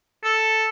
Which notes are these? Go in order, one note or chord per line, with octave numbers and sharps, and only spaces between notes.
A4